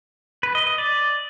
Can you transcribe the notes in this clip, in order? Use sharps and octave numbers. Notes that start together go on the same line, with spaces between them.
B4
D#5
D#5
D5